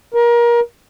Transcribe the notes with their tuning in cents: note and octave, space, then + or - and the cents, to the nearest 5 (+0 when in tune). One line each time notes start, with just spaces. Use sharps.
A#4 +25